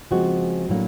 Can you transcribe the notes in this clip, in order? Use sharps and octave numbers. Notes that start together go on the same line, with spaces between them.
C#3 F3 G#3 C4 F#4
A2 F#3 A#3 D4